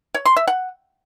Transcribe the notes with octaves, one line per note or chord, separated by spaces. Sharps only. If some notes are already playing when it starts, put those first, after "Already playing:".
C#5
C6
E5
F#5